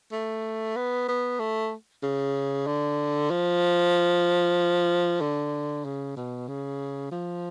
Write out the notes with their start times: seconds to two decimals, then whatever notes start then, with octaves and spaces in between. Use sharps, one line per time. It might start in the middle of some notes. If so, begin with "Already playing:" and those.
0.12 A3
0.76 B3
1.08 B3
1.40 A3
2.03 C#3
2.67 D3
3.30 F3
5.21 D3
5.85 C#3
6.17 B2
6.48 C#3
7.11 F3